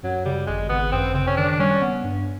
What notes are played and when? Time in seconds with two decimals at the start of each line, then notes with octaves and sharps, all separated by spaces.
0.03 F#2 F#3
0.25 C#3 G3
0.47 G#1 G#3
0.69 G#1 B3
0.92 F#2 C4
1.14 C#3 C4
1.27 C#4
1.37 D#3 D4
1.59 G3 C#4
1.81 B3
2.03 G2